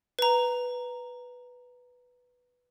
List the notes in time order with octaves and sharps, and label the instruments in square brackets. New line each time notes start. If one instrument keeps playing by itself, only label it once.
[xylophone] B4 A#5